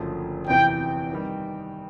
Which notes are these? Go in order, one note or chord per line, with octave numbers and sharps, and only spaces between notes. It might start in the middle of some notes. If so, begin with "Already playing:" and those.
Already playing: F#1 F#2 D3 F3 A3
E2 C3 E3 G5
D#3 G3